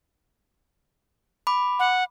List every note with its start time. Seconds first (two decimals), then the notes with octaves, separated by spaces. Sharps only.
1.47 B5 D6
1.79 F#5